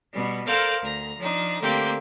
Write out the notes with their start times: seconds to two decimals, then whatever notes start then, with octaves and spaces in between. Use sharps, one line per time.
0.12 B2 G3
0.47 A4 A#4 C5 D5 F5
0.81 D2 A#5
1.18 F3 D4 D#4
1.60 D3 A3 A#3 C4 G4